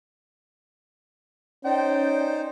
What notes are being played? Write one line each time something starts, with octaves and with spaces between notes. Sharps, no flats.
C#4 D#4 C5 D5 G5